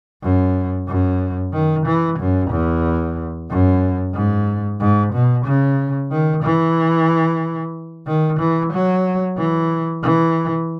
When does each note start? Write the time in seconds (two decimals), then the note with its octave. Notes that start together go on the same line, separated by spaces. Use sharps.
0.23 F#2
0.88 F#2
1.53 D#3
1.86 E3
2.19 F#2
2.51 E2
3.50 F#2
4.15 G#2
4.80 G#2
5.13 B2
5.45 C#3
6.11 D#3
6.43 E3
8.07 D#3
8.40 E3
8.73 F#3
9.37 E3
10.03 E3